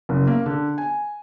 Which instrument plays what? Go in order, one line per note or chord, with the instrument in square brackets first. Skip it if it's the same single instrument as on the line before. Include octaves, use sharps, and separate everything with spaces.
[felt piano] F#1
A#3
D3
G#5